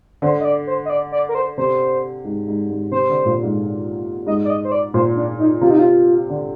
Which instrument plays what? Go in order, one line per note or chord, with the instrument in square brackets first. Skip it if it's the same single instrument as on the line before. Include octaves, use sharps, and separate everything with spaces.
[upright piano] D3 [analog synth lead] C5
[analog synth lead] D#5
D5
C5
D#5
D5
D5
A#4
C5
[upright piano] C3 [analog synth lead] C5
[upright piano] G#2
G#2
G#2
[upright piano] C3 [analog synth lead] C5
[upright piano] D3
A#2
G#2
[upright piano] G#2 [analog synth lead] D#5
[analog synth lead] D5
D#5
C5
D5
[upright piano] A#2 [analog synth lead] C5
[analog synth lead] D4
D#4
[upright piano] C3 [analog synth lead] F4
[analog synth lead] D#4
F4
[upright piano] D3